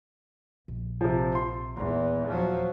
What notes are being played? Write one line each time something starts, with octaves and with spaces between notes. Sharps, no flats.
A#1
C3 F3
C6
D#1 E2
F3 F#3